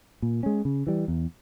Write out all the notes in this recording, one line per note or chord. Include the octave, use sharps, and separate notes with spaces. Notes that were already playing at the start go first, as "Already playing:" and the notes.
A#2
G#3 C#4
C#3
E3 G3
E2